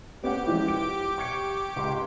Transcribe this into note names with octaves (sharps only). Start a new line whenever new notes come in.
B3 C#4 G4 F#5 D6
E3 F3 G#3
D7
C#6 G#6 C#7
C#2 C6